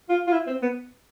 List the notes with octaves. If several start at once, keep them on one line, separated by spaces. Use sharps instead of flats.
F4
F4
E4
C4
B3